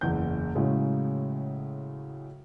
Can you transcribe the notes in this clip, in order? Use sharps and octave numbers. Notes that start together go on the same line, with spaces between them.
F#1 E2 G6
A2 C#3 F#3 G#3